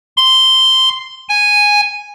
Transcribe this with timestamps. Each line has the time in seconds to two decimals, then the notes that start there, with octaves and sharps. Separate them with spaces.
0.17 C6
1.29 G#5